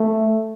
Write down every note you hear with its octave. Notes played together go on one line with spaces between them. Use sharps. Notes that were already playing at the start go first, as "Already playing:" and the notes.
Already playing: A3